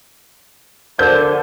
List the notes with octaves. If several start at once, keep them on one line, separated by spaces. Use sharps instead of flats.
D3 A#4 C5 G6